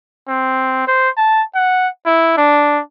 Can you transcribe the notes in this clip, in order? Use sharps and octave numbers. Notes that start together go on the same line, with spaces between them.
C4
C5
A5
F#5
E4
D4